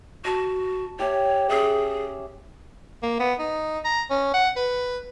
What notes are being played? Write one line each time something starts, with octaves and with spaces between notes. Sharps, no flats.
F#4 A5
G4 C#5 E5 G#5
C#4 G#4 E5
A#3
B3
D#4
A#5
C#4
F#5
B4